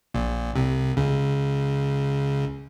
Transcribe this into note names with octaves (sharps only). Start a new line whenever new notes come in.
A#1 A#2
C2 C3
C#2 C#3